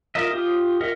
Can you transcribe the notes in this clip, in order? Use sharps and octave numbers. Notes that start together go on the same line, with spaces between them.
F4 A#4 D#5 E5
F4 G4 D#6
F4 A#4 D#5 E5 F#5